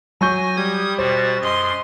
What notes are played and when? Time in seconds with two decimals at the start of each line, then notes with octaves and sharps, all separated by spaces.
0.21 F#3 G#5 C#6 G6 A#6
0.56 G3 D#6 G#6
0.99 B2 F#4 C5 A6
1.41 F#2 D#5 C6